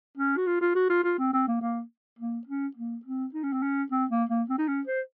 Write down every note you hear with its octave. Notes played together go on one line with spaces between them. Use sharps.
C#4
F#4
F4
F4
F#4
F4
F4
C4
C4
A#3
A#3
A#3
C#4
A#3
C4
D#4
C#4
C4
C#4
C4
A#3
A#3
C4
D#4
C#4
C5